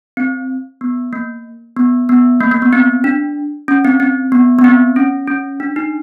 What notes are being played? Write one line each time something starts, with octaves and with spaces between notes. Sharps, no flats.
C4
B3
A#3
B3
B3
A#3
A#3
B3
C4
D4
C#4
C4
C4
B3
B3
C4
C#4
C#4
D4
D#4